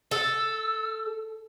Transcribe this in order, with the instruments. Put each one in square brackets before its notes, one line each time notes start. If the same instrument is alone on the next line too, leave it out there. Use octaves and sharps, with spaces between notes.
[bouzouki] A4 [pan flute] E6